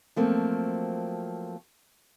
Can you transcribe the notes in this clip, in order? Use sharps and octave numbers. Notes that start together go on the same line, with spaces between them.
F3 F#3 A3 A#3 C4